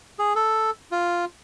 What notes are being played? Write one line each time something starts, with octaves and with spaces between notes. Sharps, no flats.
G#4
A4
F4